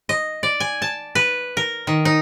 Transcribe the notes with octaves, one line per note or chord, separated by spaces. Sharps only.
D#5
D5
G#5
A5
B4
A#4
D#3
D#4